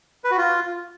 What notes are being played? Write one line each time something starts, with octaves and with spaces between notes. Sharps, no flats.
B4
F#4
F4